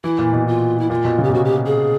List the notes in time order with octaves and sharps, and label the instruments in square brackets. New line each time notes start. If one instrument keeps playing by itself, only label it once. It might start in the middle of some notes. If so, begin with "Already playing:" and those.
[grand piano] E3 [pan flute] E4
[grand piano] A#2
B2
[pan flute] F4
E4
[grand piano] A#2 [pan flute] F4
[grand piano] B2
C#3
[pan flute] G4
[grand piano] B2
[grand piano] C3 [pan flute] F#4
[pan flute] G4
G#4